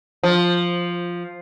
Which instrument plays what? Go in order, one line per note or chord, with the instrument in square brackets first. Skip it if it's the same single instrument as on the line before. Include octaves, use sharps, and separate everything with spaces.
[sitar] F3